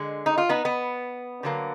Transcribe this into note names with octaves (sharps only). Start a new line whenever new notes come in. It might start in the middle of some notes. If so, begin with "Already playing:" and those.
Already playing: D3 G#3
D#4
F4
B3 D#4
B3
D3 F#3 A#3